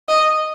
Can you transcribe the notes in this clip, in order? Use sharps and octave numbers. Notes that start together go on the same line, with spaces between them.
D#5